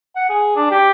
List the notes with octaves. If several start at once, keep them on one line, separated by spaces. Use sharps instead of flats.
F#5
G#4
D4
G4